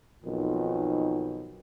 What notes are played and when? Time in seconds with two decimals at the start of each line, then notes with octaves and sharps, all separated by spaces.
0.25 B1 F2 D#3